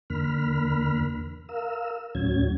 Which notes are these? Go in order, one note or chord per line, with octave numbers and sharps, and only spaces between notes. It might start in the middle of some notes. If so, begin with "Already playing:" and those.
E2 D3 A#3 B5 F6
A#4 F5 E6
D#2 A2 F#3 C#4 G#6